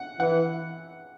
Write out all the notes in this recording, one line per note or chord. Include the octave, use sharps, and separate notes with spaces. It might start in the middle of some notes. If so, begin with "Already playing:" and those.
Already playing: F#5
E3 F#5